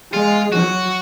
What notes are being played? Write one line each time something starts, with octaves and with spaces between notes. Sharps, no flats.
G#3 F4
F#3 F#4